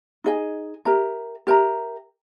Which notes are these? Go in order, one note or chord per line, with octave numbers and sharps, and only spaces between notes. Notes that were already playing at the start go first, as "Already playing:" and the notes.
D#4 G#4 D#5 G#5
G4 A#4 E5 A#5
G4 A#4 E5 A#5